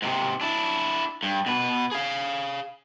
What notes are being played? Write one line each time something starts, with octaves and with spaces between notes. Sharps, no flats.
G#2 C3
D4 E4
G2
B2 B4
G#4 F5